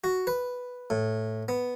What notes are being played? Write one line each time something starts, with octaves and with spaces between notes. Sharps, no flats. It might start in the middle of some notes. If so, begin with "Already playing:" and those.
F#4
B4
A2
B3